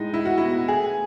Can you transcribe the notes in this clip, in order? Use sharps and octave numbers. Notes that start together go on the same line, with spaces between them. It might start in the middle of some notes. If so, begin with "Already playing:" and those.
Already playing: A2 G#3 D#4
A2 E4
F#4
B3 E4
A3 G#4